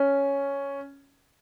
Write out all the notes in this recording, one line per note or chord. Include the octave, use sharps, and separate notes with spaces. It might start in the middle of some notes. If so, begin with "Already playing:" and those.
Already playing: C#4